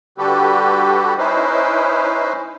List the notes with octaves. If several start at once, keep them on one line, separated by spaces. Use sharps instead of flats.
D3 G3 F#4 G4 A4 B4
C#4 D#4 E4 B4 C5